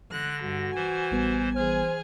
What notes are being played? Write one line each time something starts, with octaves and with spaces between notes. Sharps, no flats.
D3 F#6 A#6
G2 F#4
E3 C5 G#5
A1 G3 B3
E3 G#4 C5 G#5 F6